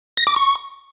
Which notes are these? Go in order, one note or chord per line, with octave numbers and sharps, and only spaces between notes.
A#6
D6
C#6